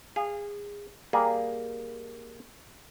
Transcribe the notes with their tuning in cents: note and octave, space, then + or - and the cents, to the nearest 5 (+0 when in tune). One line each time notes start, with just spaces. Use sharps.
G#4 -25 F5 -5
G3 +0 A#3 +0 G#4 +0